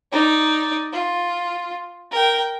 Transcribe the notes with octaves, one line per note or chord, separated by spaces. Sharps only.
D#4 D5
F4
A#4 G5